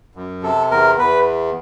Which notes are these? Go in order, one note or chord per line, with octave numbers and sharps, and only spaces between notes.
F#2
C3 A4
E2 A#4
E2 B4